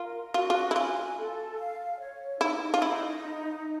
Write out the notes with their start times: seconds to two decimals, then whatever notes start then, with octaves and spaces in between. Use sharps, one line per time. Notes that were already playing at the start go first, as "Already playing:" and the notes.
Already playing: F4 A#4
0.34 F4 F#4
0.50 F4
0.71 E4
0.76 F4 G#5
1.17 A4
1.58 F5
2.00 C#5
2.41 D#4 E4
2.74 F4
2.81 D#4 E4